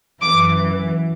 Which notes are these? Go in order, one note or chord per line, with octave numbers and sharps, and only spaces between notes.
F#2 E3 D6